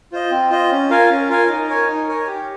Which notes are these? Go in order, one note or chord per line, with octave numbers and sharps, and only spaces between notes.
F4 C5 D#5
C4
F4 C5 D#5
C#4
F4 A#4 F5 G#5
C#4
F4 A#4 F5 G#5
D#4
A#4 C#5 G#5
D#4
A#4 C#5 G#5
G4